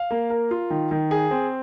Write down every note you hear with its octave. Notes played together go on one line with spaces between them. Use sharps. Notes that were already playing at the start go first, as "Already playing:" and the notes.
Already playing: F5
A#3
A#4
F4
D#3
D#3
G#4
C4